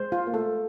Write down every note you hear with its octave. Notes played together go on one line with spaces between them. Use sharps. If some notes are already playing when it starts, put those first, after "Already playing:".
Already playing: G#3 C5
F4
A#3
A3 A4